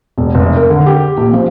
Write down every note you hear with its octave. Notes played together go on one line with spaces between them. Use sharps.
E1
F1
A#4
D3
G4
A#1
F3